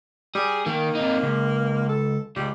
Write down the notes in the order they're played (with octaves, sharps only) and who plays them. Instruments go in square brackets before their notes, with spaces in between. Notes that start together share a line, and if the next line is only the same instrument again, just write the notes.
[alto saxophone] G3 [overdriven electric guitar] G#4
[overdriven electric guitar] D#3 [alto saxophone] A#3
[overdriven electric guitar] C3 D#4
C#2
[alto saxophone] A4
[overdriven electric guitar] C#2 [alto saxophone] G3